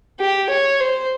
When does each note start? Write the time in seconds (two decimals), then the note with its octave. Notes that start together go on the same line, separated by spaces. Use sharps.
0.20 G4
0.50 C#5
0.80 C5